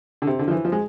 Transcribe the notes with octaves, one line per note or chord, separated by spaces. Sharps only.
D3
C3
D3
F3
E3
F3
G#3